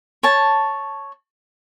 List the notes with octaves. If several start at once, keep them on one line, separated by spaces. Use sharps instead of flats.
C#5 A5